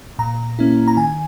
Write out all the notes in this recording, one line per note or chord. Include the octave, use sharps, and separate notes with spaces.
A#2 A#5
A#3 C#4 E4
A#5
D#3 G#5